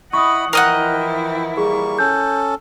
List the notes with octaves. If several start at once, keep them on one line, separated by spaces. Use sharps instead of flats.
E4 D#5 F#5 B5 C#6 D#6
E3 F3 E4 A#4 D#5 F#5 G5
G3 A#3 G#4 C#6
C#4 A4 G6